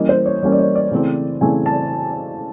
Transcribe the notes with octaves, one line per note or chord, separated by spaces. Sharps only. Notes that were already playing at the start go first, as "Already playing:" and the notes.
Already playing: E3 G3 A#3 C#4 D#5
C5
C#5
E3 G3 A#3 C#4 C#5
D5
C#5
D5
C#3 E3 A3 C4
C#3 E3 A3 C4 G#5
A5